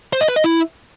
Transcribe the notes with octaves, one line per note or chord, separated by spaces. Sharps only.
C5
D#5
B4
D#5
E4